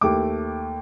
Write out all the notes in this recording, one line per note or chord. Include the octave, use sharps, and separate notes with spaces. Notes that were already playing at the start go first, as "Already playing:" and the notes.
D#2 A3 D6